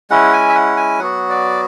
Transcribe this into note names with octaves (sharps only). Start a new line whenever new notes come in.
G#3 C#4 E4 F#5
G#5
E5
F#5
G#5
F#3 B3 F#4 F#5
D5